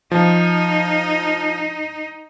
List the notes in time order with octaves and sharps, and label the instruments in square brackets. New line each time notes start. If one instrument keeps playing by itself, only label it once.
[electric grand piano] F3 [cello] D#4